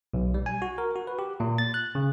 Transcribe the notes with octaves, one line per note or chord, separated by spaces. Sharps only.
B1
G3
G#5
F#4
A#4
F#4
B4
G4
A#2
A6
F#6
C#3